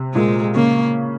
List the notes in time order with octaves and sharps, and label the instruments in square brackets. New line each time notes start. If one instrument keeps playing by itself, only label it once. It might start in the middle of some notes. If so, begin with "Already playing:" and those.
Already playing: [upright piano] C3
[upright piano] A#2 [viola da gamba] G#3
[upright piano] C#3 [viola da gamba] A#3